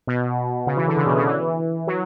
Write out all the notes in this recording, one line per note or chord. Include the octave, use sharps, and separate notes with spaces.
B2
C#3
E3
D3
C#3
B2
C#3
E3
F#3